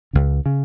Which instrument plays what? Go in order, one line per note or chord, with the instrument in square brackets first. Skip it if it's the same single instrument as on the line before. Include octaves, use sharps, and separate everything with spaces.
[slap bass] C#2 C#3
C#3